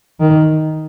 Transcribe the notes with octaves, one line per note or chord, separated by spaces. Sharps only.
D#3